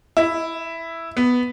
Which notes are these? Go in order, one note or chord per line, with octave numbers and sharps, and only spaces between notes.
E4
B3